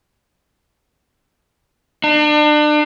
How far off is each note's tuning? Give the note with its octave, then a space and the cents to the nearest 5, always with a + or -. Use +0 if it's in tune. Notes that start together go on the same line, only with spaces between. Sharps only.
D4 +35